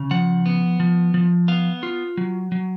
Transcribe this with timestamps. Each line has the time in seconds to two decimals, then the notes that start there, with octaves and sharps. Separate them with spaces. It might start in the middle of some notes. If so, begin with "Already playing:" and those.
Already playing: C#3
0.11 F3 F#5
0.46 B3
0.80 F3
1.14 F3
1.48 B3 F5
1.83 F4
2.17 F#3
2.52 F#3